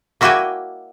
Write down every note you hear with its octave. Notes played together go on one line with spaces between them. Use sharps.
A#3 E4 F#4 D5 G5 G#5